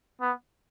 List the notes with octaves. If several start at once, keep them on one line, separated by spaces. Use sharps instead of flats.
B3